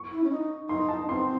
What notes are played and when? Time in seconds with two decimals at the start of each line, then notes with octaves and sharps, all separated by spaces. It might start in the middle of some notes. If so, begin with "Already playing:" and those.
Already playing: C#6
0.12 E4
0.24 C#4
0.31 D#4
0.69 D#4 C6
0.89 A5
1.08 C4 C6